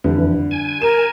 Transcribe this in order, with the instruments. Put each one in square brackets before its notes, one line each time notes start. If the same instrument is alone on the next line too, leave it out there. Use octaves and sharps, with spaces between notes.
[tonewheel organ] F2 E3 [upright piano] D3 G3
[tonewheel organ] G#5
[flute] A#4 [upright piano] E7